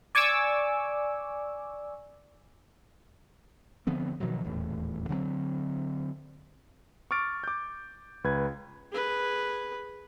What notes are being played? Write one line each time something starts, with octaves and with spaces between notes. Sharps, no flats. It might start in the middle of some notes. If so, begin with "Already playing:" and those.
D5 G#5 C#6 D6 E6
D3 F3 B3 C4
B2 D#3 F3 F#3
D#1 E2 A2
D3 F#3 G3 C4
C#6 D6 F6 A6 D7
D6 G6
C#2 B4 G#6
G#4 B4